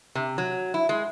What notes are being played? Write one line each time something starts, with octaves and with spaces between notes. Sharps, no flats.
C3
F#3
E4
G#3